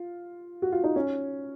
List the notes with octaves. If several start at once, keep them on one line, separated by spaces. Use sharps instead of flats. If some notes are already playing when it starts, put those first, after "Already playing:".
Already playing: F4
F#4
F4
D#4
C#4